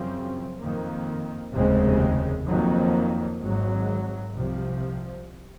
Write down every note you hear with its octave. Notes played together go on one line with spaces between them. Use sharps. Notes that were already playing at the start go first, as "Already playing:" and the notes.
Already playing: F#2 C#3 F3 C4
F2 D#3 A#3
F1 D#2 C#3 G#3 C4
F2 D#3 F#3 A#3
G#1 G#2 F#3
C2 C3 F3